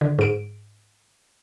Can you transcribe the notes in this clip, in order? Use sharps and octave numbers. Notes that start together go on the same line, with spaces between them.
D3
G#2 D7